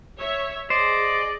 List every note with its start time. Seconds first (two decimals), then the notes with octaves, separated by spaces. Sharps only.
0.18 C#5 E5
0.70 G#4 C5 D5 D#5